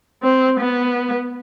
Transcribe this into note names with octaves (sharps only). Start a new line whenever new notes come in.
C4
B3